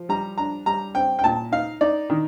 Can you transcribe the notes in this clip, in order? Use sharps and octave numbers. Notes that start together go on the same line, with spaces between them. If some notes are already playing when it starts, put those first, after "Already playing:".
Already playing: F3
G3 A#5
D4 A#5
G3 A#5
C4 G5
G5
A#2 A5
D#4 F5
D#4 D5
D#3